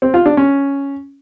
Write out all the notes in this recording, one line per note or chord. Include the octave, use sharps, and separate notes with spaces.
C4
F4
D4
C#4